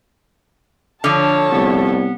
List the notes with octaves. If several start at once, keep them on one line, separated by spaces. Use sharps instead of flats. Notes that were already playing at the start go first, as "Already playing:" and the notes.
D3 F3 C#5 A5 F6
C2 B3